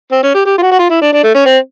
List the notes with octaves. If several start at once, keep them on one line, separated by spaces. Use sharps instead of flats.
C4
C#4
G4
G4
F4
F#4
F#4
F4
E4
D4
D4
A3
C#4
C4